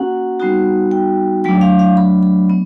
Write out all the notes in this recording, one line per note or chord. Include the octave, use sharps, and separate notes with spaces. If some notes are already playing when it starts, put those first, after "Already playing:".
Already playing: A#3 C#4 F#4 F#5
G3 B3 D#4 F#4
G5
F#3 A3 D4 G5
F5
F5
B5
B5
B3